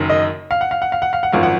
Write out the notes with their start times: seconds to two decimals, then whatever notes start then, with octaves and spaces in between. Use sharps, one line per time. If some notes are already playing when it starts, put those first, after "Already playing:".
Already playing: F#1 F#2 D#3
0.09 D#5
0.51 F5
0.61 F#5
0.71 F5
0.82 F#5
0.92 F5
1.02 F#5
1.13 F5
1.23 F#5
1.33 G#1 F#2 F3 F5
1.43 F#5